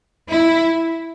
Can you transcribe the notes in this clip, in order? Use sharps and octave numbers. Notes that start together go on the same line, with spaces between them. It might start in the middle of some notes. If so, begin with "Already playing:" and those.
E4